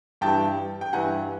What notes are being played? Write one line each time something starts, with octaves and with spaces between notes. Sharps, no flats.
G2 E3 G3 G5 A5
G5
G2 E3 G3 F#5 G#5